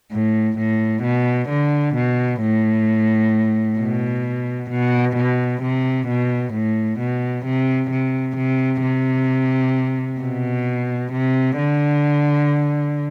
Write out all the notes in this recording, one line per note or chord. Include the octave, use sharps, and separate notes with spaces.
A2
A2
B2
D3
B2
A2
B2
B2
B2
C3
B2
A2
B2
C3
C3
C3
C3
B2
C3
D3